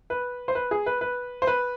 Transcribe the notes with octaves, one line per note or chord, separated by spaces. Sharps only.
B4
C5
B4
G#4
B4
B4
C5
B4